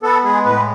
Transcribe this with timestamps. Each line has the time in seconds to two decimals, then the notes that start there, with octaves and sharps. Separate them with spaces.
0.03 B3 A4
0.24 G#3 G#4
0.46 A2 B4